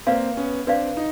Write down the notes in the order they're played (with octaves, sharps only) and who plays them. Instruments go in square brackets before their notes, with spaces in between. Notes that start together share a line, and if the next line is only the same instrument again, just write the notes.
[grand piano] A#3 C4 [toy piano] B4 D5 F5
[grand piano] B3 C#4
[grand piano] C4 D4 [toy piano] B4 D5 F5
[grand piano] D#4